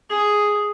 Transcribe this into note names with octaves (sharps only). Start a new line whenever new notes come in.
G#4